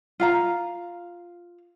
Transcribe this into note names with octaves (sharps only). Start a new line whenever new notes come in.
F4 F5 A#5